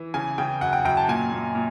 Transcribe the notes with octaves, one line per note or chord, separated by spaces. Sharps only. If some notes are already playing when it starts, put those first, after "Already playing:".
Already playing: E3
C#3 G#5
C#3 G5
F#2 F#5
G5
F#2 G5
A5
A#2 G#5
A#2
A#2